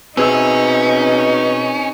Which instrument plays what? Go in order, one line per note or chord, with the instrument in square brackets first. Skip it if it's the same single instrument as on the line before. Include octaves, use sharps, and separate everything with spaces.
[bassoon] B2 [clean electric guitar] C4 G#4 E5 [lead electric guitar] C#4 [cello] D#4